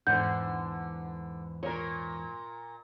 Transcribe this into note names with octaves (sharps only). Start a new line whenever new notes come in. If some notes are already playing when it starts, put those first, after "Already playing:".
E2 G#2 D3 E3 F#5 G6
A#2 A#4 C#5